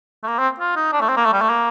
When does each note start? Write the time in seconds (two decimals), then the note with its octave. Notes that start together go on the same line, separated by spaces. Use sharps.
0.23 A3
0.28 A#3
0.38 C4
0.60 F4
0.76 D#4
0.92 D4
1.01 A3
1.09 C4
1.17 A#3
1.25 A3
1.33 G3
1.41 A3
1.49 A#3